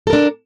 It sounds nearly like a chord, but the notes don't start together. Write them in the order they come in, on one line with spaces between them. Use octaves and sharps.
A4 A#4 D4